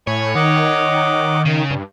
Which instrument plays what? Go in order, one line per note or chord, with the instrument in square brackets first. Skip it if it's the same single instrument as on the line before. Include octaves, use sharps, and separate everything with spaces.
[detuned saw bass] A2 [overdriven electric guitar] C#5 [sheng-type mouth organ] G#5 B5
[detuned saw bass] D#3 [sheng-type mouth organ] D#5 F#5 D6
[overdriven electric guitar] C#3
[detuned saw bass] G2